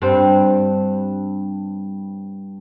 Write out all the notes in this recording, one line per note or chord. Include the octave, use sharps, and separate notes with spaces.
G2 C4